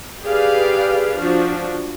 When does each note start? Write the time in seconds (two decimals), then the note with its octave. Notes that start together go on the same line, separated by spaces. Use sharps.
0.23 G4 G#4 B4 D5 F5
1.19 F3 D4 F#4